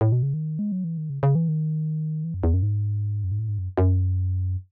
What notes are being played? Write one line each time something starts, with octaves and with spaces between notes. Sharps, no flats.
A2
B2
C#3
D#3
G#3
F#3
E3
D#3
C#3
C#3
E3
D#3
E3
F#2
E2
F#2
G#2
F#2
G#2
A2
G#2
F#2
F#2